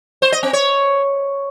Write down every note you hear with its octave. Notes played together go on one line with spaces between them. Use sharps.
C5
D#5
C4
C#5